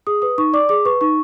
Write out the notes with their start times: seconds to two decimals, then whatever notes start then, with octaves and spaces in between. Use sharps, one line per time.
0.07 G#4 D#6
0.22 B4 D#6
0.38 D#4 C#6
0.53 D5 D6
0.69 G#4 D6
0.85 B4 C#6
1.01 D#4 C#6